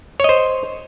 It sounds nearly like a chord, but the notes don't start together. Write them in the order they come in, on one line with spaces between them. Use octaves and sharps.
C#5 D#5 C5